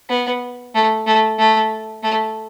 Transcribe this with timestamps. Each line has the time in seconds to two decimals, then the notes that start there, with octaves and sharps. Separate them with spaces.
0.09 B3
0.75 A3
1.06 A3
1.38 A3
2.03 A3